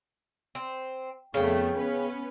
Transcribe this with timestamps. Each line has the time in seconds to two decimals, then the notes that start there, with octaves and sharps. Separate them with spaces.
0.55 C4
1.34 F2 C#3 A3 B3 G5
1.77 B3 C#4 B4